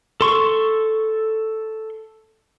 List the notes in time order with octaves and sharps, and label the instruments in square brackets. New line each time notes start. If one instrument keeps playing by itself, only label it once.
[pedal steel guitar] A4 C6 C#6